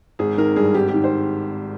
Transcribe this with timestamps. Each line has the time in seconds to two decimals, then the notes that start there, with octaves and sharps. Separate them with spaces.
0.19 G#1 G#4
0.38 D#3 A#4
0.56 G2 G#4
0.74 G#1 G4
0.89 G4
0.94 D#3
1.04 C5